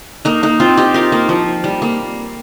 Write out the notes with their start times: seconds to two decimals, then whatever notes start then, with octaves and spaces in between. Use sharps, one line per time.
0.25 A#3 D#4
0.43 A#3 D#4
0.60 C4 F4
0.77 D#4 G4
0.94 F4 A#4
1.12 A#3
1.29 F3
1.64 G3
1.82 A#3